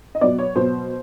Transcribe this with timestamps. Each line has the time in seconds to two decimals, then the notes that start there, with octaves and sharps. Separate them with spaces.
0.15 D#5
0.21 B2 F#3 B3 D5
0.39 C#5
0.55 B2 F#3 B3 C5